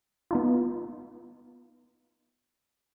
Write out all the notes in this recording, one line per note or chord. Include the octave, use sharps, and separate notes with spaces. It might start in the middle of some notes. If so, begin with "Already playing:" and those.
B3 D#4 F4